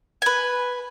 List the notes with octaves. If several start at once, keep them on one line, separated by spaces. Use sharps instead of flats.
B4 G#5